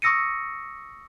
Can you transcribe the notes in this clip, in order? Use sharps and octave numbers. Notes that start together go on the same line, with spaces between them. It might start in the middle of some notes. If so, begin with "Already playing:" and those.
C#6 D#6 E6 A#6 C#7 D#7